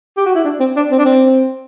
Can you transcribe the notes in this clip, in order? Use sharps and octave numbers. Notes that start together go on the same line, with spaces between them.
G4
F#4
E4
D4
C4
D4
C4
D4
C4